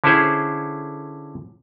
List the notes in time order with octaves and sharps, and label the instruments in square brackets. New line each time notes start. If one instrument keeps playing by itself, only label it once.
[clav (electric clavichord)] D3 C#4 E4 G#4 C5